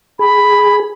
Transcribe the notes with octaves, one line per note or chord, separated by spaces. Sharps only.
G#4 B5